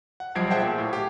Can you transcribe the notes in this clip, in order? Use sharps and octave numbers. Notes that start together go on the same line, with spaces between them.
F#5
B1 F3 G3 G#6 C7 D7
G#4 C5 E5 F#5 G5 A5
A#2
A2
G4